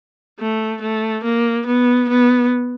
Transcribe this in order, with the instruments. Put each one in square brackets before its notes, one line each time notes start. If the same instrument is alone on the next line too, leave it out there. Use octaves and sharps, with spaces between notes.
[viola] A3
A3
A#3
B3
B3